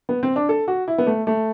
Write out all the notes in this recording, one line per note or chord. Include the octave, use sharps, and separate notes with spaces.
B3
C4
D4
A4
F#4
E4
B3
A3
A3